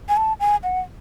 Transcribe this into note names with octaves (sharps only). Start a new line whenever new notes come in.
G#5
A5
G#5
F#5